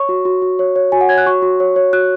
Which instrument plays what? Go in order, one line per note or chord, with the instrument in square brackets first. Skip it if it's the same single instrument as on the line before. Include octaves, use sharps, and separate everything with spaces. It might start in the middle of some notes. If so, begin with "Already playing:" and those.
Already playing: [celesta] C#5 C#6
F#4
F#4
F#4
C#5
C#5
F#4 G#5
F#5
C#5 G#6
F#6
F#4 C#6
F#4
C#5
C#5
F#4 F#6